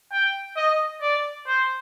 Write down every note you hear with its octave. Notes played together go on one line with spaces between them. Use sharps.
G5
D#5
D5
C5